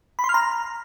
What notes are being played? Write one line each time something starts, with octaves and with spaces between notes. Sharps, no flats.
B5
C6
F6
A#5